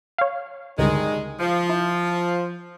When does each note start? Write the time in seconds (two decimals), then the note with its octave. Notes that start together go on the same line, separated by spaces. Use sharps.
0.18 C#5 F5
0.79 C#2 G2 D3 D#3 G3 G#3
1.40 F3
1.69 E4